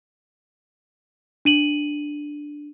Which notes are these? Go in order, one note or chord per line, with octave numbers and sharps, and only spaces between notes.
D4 D#7 F#7